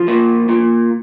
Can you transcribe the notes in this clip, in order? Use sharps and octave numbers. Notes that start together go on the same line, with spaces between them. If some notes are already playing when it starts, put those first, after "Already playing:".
Already playing: F3
A#2
A#2